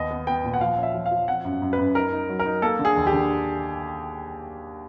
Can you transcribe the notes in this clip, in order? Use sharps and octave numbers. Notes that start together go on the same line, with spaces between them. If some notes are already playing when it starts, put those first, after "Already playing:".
Already playing: D#2 B3 D#5
B3
B3 G5
A#2
F#5
F3 F5
C#4
E5
F3
F5
F3
C4 F#5
F#2
F#2
B4
F#2
D#4 A#4
D#4
F#3
A#4
D#4
A#3 A4
D3
G#4
D#2
G4
D3